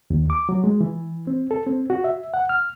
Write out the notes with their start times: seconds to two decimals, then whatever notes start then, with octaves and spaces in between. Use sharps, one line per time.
0.10 D#2
0.30 D6
0.49 F#3
0.64 G#3
0.81 E3
1.27 C4
1.51 A4
1.67 C4
1.90 F#4
2.04 E5
2.34 F#5
2.49 F6